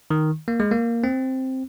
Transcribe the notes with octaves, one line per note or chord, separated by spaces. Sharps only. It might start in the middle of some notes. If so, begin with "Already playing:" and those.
D#3
A#3
G#3
A#3
C4